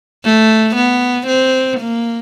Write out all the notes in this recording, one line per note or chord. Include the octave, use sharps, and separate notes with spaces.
A3
B3
C4
A#3